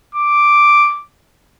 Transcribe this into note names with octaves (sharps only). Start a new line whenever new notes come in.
D6